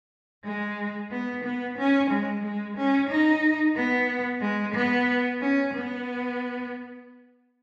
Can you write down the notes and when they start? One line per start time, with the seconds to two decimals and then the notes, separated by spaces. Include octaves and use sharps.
0.44 G#3
1.11 B3
1.43 B3
1.78 C#4
2.10 G#3
2.42 G#3
2.77 C#4
3.10 D#4
3.76 B3
4.41 G#3
4.74 B3
5.41 C#4
5.74 B3